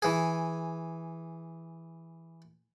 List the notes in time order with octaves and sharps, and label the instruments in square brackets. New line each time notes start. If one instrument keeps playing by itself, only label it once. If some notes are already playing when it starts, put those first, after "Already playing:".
[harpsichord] E3 G#4